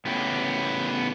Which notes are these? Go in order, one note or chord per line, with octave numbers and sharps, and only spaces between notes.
A2 C#3 B3 E4 G4